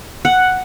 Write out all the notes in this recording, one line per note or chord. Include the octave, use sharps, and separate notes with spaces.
F#5